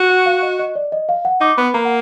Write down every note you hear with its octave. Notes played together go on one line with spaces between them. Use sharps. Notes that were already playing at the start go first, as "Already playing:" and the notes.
Already playing: F#4
F#5
F5
D#5
D#5
D5
D#5
F5
F#5
D#4 D6
B3 B5
A#3 A#5
F#5